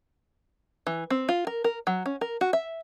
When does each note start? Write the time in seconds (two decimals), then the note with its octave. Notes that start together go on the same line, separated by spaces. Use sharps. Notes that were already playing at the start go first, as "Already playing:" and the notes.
0.87 E3
1.10 C4
1.29 F4
1.47 A#4
1.64 A#4
1.87 F#3
2.06 C#4
2.21 A#4
2.41 F#4
2.53 E5